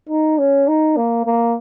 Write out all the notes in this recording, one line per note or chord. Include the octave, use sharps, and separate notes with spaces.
D#4
C#4
D#4
A#3
A#3